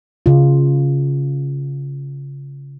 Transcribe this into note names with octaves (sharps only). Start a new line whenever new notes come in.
C#3 F4